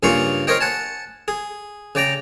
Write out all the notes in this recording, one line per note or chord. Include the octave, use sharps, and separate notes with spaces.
G2 C#3 A#3 F4 G#4 C#6
A#4 C5 C#5 D#5 G5
F#5 G#5 A5
G#4
C#3 D5 G5 A#5